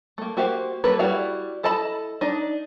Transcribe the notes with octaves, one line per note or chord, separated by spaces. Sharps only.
A3 A#3
A#3 F#4 G4 C5 F5
F#3 A#3 A4 B4
G3 E4 F#4 D5 F5
E4 A4 D#5 A5 B5
D4 D#4